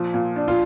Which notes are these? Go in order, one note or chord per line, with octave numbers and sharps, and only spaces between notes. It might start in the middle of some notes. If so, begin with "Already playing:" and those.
Already playing: A#2 F3 F4
A#2
D4
F4